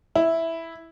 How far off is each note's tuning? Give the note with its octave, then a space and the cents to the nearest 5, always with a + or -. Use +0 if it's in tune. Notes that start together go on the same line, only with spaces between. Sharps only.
E4 -5